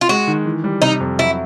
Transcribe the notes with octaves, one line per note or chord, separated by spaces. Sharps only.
F4
G#3 F#4
D#3
E3
G3
C3 D#4
F2
F#3 E4